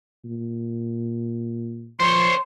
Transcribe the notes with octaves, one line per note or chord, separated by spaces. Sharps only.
A#2
F3 C5 C#5 C6